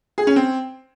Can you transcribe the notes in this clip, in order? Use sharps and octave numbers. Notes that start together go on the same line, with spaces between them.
G#4
C#4
C4